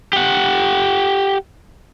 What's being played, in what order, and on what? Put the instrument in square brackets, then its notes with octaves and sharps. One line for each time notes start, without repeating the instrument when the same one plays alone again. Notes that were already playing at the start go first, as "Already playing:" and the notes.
[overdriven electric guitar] G4 F#5